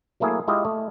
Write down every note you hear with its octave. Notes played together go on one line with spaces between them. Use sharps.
F#3 A3 A#3 E4 G#4
G#3 E4 F4 G4 D#5
A3